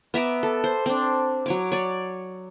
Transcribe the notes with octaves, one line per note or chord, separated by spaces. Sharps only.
B3 E5 A#5 D6
A4
C5
C4 D4
F#3 C#5 D6
C#5 D5